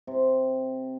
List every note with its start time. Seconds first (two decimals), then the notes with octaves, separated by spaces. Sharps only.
0.07 C3